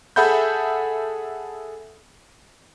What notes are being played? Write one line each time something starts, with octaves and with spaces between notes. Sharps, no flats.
G#4 A4 E5 F#5 B5 G6